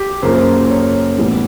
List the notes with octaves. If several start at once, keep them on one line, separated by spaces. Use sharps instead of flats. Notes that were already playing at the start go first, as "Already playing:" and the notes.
Already playing: G4
F#2 C#3 F3 A#3 C5
C#5
A2 E3 G3 B3